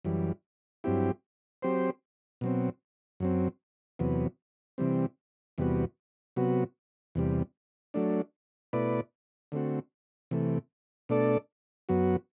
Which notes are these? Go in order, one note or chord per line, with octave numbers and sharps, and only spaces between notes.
F#2 E3 G3
G2 F#3 C4 E4 G4
F#3 C4 G4 C5
B2 F#3 C4
F#2 F#3 C4
E2 C3 F#3 B3
C3 E3 G3 C4
E2 C3 G3 B3 F#4
C3 F#3 B3 F#4
E2 C3 G3
F#3 A3 D4
B2 A3 E4 B4 D5
D3 A3 C4 F#4
C3 E3 A3
B2 A3 D4 A4 D5
F#2 F#3 B3 F#4